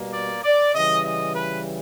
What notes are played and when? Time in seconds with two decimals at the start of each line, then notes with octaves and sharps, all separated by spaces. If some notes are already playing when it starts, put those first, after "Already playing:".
Already playing: B2 G3 A#3
0.13 D5
0.44 D5
0.74 C#3 E3 G3 D#5
1.05 D#5
1.35 B4